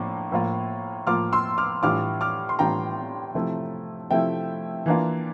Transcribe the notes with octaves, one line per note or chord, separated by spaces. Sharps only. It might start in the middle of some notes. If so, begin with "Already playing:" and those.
Already playing: A2 F3 A#3 D4
A2 F3 A#3 F4
A2 F3 A#3 F4 D6 F6
C6 E6
D6 F6
A2 E3 G3 D4 F4 D6 F6
D6 F6
C6
A2 E3 G3 D4 F4 G5 A#5
C3 F3 A3 E4
C3 F3 A3 E4 E5 G5
E3 A#3 D4 F4